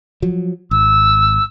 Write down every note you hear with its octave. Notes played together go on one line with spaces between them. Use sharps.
F3 F#3
G#1 E6